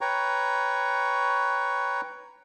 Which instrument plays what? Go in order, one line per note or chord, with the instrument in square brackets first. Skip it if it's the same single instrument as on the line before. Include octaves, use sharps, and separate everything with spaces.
[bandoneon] B4 C#5 G5 A#5 C#6